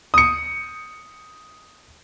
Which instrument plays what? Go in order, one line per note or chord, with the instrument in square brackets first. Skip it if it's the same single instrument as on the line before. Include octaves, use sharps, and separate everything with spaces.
[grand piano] D#6 C#7